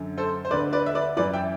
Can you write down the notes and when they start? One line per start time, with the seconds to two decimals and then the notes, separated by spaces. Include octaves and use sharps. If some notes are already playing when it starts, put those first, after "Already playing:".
Already playing: F#2 D3
0.18 A4 C5
0.45 C5
0.51 D2 D3 B4 D5
0.73 B4 D5
0.86 E5
0.95 B4 D5
1.17 F#2 E3 B4 D5
1.33 E5 G5